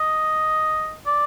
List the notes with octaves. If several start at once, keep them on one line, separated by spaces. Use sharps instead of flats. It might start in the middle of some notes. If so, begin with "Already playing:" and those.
Already playing: D#5
D5